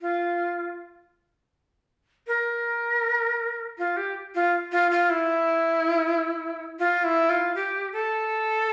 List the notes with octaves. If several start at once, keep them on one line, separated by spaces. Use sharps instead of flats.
F4
A#4
F4
G4
F4
F4
F4
E4
F4
E4
F4
G4
A4